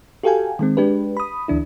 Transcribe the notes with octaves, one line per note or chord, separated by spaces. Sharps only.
F#4 G4 A4 F5 G5 G#5
D#3 G#3 C4
G#3 D4 G4 B4
B5 D#6
D2 E3 D4 E4